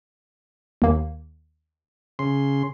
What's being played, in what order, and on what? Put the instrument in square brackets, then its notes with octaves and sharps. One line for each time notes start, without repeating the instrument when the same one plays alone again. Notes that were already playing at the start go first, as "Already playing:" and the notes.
[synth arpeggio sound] D#2 A#3
[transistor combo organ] C#3 C6